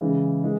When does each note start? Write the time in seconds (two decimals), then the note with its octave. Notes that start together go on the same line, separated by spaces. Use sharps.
0.01 C#3 E3 G#3
0.43 E3 G#3